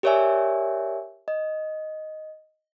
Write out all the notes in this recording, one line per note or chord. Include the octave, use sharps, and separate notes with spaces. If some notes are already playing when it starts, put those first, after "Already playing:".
G4 A#4 C#5 D5 E5 G#5
D#5